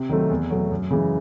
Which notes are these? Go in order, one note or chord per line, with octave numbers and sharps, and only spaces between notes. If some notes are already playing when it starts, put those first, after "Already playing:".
Already playing: C3
D#3 F#3 A3 C4
E2
B2 F#3 A3
F#2
C#3 E3 G#3